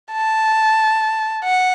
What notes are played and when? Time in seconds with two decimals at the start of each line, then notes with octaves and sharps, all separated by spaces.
0.11 A5
1.43 F#5